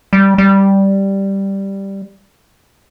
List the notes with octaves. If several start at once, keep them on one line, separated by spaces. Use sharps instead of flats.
G3
G3